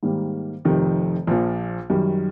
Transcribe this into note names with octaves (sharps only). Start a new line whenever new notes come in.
G#2 D#3 G3 A#3
F1 F2 C3 D#3
A#1 A#2 F3
F#2 D#3 G3